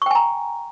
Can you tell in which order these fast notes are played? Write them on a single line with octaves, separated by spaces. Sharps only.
C#6 G5 G#5 A#5